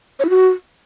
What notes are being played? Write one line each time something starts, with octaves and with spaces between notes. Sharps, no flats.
C#5
E4
F#4